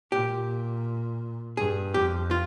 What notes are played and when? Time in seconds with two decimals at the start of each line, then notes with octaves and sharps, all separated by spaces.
0.12 A#2 G4
1.57 G2 G#4
1.94 F2 G4
2.31 F4